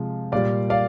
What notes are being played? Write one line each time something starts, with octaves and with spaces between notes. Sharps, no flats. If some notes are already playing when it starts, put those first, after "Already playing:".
Already playing: C3 F3 G#3
A#2 G3 D5 F5
D5 F5